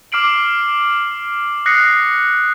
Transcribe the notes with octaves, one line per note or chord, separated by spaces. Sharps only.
D6 F6 C7 D7 F#7
D#6 F#6 A#6 C7 C#7